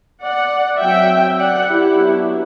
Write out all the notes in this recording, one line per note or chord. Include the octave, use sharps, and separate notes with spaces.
D5 F#5
F#3 C4 E5 G5
D5 F#5
E4 G4
F#3 B3 D4